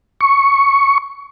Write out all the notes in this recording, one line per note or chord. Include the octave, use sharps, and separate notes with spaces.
C#6